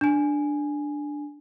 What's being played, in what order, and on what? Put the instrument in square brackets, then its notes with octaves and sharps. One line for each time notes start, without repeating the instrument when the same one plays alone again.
[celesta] D4 G#5